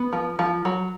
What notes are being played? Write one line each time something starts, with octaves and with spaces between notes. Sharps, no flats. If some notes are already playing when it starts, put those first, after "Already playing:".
Already playing: B3
F3
F3
F#3